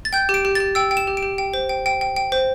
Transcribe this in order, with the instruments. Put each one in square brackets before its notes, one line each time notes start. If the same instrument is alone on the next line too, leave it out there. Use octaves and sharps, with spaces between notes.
[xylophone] A6
G5 G6
G4
D7
G4
A6
G4
G5 E6
G5
E7
G4
D7
G4
G5
C5
G5
G5
G5
G5
C5